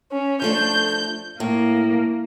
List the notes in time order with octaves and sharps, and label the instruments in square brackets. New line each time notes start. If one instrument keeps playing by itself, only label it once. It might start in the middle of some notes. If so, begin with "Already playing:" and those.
[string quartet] C#4
[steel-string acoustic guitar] F3 A3 D4 [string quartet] G6
[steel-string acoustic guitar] A2 [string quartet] A#3